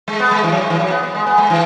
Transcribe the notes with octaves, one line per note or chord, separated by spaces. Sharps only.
G#3
B3
G#3
E3
F#3
G#3
E3
F#3
B3
B3
G#3
B3
G#3
E3